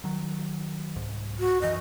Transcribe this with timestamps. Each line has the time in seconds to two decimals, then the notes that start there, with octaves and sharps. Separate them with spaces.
0.04 D#3 F#3
0.96 C2 G#2
1.39 F#4
1.62 F#2 E3 D#5